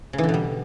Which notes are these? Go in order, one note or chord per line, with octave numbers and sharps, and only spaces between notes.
C#3
E3
D3
B2
G3